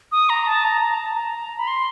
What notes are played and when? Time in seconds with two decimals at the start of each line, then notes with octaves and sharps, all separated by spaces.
0.12 D#6
0.30 A#5
0.46 A5
0.64 A#5
0.81 A#5
0.99 A5
1.15 A#5
1.59 B5
1.67 C6